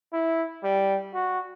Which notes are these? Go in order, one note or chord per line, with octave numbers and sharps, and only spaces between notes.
E4
G3
F#4